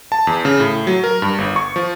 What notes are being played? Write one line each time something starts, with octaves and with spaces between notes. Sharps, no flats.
A5
E2
C#3
A2
F#3
A#4
G2
G1
C#6
F3